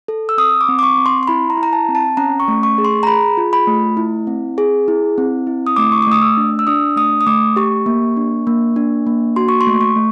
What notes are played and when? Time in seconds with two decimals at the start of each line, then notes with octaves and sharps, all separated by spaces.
0.08 A4
0.29 E6
0.38 C4 D#6
0.61 D6
0.69 C4
0.79 D6
0.83 C#6
0.98 C4
1.06 C6
1.23 C6
1.27 E4 B5
1.50 A#5
1.57 E4
1.63 A#5
1.73 A5
1.88 C4
1.95 A5
2.17 C#4 A#5
2.40 C#6
2.48 A3
2.63 C#6
2.78 G#4
2.85 C6
3.03 A#5
3.07 G#4 B5
3.37 F4
3.53 B5
3.67 A3
3.97 E4
4.27 C4
4.58 G#4
4.88 E4
5.18 C4
5.47 E4
5.67 D#6
5.76 A3 D6
5.92 C#6
6.02 D6
6.07 A3 D#6
6.22 E6
6.37 D4
6.59 E6
6.67 D4 D#6
6.96 A3 D#6
7.21 D#6
7.27 A3 D6
7.56 G4 C#6
7.86 A#3
8.17 D4
8.47 A#3
8.76 D4
9.07 A#3
9.36 F#4 C6
9.49 C#6
9.61 C6
9.67 A3
9.81 C#6
9.96 A3